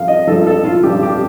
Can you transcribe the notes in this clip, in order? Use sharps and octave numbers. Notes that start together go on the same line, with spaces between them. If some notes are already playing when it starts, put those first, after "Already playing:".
Already playing: G2 F3 F5
D#5
G2 F3 A4
A4
F4
G2 F3 G4
G4